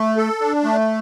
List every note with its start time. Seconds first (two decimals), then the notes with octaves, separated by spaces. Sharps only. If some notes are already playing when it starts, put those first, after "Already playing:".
Already playing: A3
0.17 A4
0.41 D4
0.64 A3